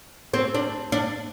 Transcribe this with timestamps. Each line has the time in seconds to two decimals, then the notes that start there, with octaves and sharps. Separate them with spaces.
0.34 C4
0.55 D4
0.92 D4